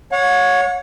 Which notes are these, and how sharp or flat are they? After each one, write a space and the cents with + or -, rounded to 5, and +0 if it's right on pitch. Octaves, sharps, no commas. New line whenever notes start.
C#5 +0 F#5 -40